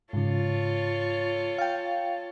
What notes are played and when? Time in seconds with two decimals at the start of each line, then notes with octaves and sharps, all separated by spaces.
0.13 G#2 C#3 F4 A4 C#5
1.58 F5 G5